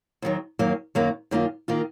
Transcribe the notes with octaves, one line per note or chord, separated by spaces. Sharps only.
D#2 D#3 F#3
F#2 D#3 F#3 A#3
F#2 D#3 F#3 A#3
F#2 D#3 A#3 F4
D#3 A#3 F4